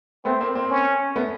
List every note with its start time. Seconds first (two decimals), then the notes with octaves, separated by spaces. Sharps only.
0.25 A3 B3 C4
0.40 A#3 C4
0.55 A#3 C4
0.71 C#4
1.16 A3 B3